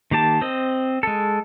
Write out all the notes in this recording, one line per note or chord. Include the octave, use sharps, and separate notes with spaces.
D#3 A#3 G4 A5
C4 D#5
G#3 A4